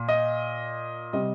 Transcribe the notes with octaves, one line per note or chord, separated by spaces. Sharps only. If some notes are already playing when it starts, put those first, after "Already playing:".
Already playing: A#2
D#5
C3 G3 D#5